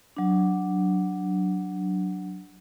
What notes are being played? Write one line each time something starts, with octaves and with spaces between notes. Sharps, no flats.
F#3 D4